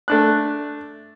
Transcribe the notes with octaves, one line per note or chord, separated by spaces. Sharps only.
A3 D4 F#6